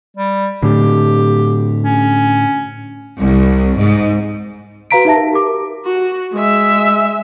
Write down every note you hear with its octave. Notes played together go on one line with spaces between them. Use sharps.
G3
A2 D3 G4
C#4
C2
G#2
F#4 B4 F5 A#5 B6 D7
D#4 G4 E5 A5 A#6
A#4
G4 A#4 D6
F#4
G#3 E5